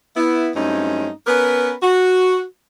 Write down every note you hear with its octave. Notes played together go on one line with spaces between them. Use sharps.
B3 E4
G2 F#3 A3 C4 C#4 D#4
B3 C#4 A#4 B4
F#4